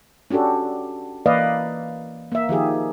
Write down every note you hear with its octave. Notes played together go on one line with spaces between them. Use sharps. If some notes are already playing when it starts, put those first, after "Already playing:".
C#4 D4 F#4 G4 A4
E3 A#3 B4 D5 D#5 F5
A#3 E5
D#3 F3 G4 G#4